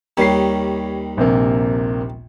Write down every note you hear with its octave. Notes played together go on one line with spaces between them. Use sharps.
D#2 D#3 G3 C#5 C7
A#1 C3 A#3